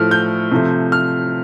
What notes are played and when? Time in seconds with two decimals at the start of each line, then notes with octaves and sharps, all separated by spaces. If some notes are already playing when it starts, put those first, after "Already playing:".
Already playing: A2 F3 A3 F6
0.11 G6
0.52 C3 F3 A3
0.92 F6